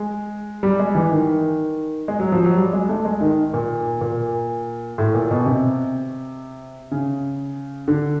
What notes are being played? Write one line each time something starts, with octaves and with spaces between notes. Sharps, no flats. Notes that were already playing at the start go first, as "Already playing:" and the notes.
Already playing: G#3
G3
G#3
E3
D#3
G#3
F#3
F3
F#3
G3
G#3
A3
G#3
D#3
A#2
A#2
A2
A#2
B2
C3
C#3
D3